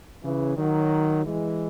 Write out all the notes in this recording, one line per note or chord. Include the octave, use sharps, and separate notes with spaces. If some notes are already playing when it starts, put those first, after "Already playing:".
C#3 E3
D#3 F#3
E3 G#3